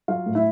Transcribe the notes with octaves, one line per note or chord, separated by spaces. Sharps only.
F#3 F4 F5
A2
E4 E5